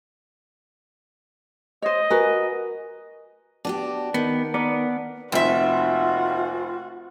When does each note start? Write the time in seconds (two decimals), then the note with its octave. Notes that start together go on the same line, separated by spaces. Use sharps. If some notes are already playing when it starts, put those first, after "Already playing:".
1.82 C5 C#5 D#5
2.10 F#4 A#4 B4 G#5
3.65 B3 D4 F#4 G4
4.14 D#3 B3
4.54 B3 A#4 D5
5.32 F1 D#2 C4 F4 F#4 E5